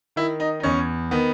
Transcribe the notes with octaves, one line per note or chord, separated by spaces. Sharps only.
D#3 E4
D#4
D#4
E2 C#4
D#3 B3